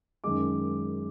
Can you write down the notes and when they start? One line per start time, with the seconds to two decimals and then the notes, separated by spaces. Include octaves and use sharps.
0.24 F#2 D#3 G#3 D6